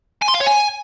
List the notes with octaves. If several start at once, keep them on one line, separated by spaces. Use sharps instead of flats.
G#5
C6
F5
C#5
G#5